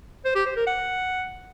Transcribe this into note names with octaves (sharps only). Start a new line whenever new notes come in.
C5
G4
C5
A#4
F#5